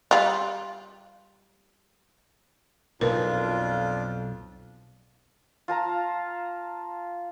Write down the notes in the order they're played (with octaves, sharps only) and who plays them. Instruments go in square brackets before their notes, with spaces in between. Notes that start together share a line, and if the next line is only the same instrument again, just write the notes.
[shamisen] G3 F4
[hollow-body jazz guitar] B1 [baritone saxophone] F2 [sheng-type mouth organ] D4 F4 [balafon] A#4 B4
[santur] F4 A5 A#5